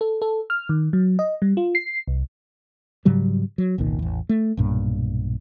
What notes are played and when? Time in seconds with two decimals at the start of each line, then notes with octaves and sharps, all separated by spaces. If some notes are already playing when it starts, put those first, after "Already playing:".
0.01 A4
0.22 A4
0.50 F6
0.69 D#3
0.93 F#3
1.19 D#5
1.42 G3
1.57 F4
1.75 C7
2.08 C2
3.05 G#2 C#3 F#3 G3
3.58 F#3
3.78 G1 C2 A#2 D#3
3.99 A1 E2
4.29 A3
4.57 B1 G2 A#2